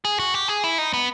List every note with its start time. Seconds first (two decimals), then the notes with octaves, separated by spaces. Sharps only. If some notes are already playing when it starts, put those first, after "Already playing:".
0.05 G#4
0.19 F#4
0.34 G4
0.48 G#4
0.64 E4
0.78 D#4
0.93 B3